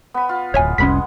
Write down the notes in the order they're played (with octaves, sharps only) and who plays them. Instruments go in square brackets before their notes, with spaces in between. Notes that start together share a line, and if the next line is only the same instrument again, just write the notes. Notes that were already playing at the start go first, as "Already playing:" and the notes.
[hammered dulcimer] B3 B5
F4
[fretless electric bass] D1 G#1 [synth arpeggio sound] C#5 E5 G#5
[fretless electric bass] F1 C2 C#4 [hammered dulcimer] G#3 B3 F#5 [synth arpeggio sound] B5 B6